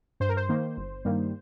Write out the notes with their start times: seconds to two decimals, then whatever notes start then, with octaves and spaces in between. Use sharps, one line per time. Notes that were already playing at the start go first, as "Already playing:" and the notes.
0.20 G2 C5
0.29 A#4
0.37 C5
0.49 D#3 A#3
0.77 G1
1.05 G2 D#3 G3 A#3